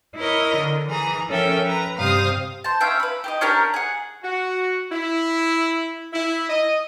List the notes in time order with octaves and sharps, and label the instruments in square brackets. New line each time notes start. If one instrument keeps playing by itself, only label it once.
[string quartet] E4 A#4 C#5 D#5
D3
E3 G#4 A#5
F3 C#4 A4 A#4 E5 G5
B4 A#5
G2 C3 C5 F5 D#6
[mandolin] C5 A5
C#4 E5 F5 G5
B4 B5
G4 A4 D#5
C#4 D4 G4 A#4
G#4 F#5
[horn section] F#4
E4
E4
D#5